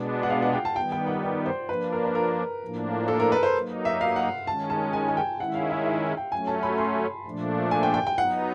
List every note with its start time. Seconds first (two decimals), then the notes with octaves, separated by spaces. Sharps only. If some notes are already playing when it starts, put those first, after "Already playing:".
Already playing: B2 G#3 B3 D4
0.23 F#5
0.30 F5
0.42 F#5
0.53 G5
0.65 A5
0.76 D#3 G3 B3 G5
0.92 G5
1.07 F#5
1.23 D5
1.46 C5
1.69 F3 A#3 D4 B4
1.93 A#4
2.05 B4
2.15 A#4
2.62 A2 F3 A#3 D4
3.08 A4
3.20 A#4
3.32 B4
3.43 C5
3.55 F#3 A#3 D#4
3.85 E5
4.01 F5
4.16 F#5
4.46 D#3 G#3 C#4 A5
4.70 A5
4.93 G#5
5.08 G#5
5.17 G5
5.39 D#3 G#3 C#4 E4 F#5
5.55 F5
5.71 E5
5.86 E5
6.17 G5
6.32 F#3 A3 C#4 G#5
6.47 A5
6.63 B5
6.78 C6
7.26 A#2 F3 A3 D4
7.71 G#5
7.83 G5
7.94 G5
8.07 G5
8.17 F#3 B3 D#4 F#5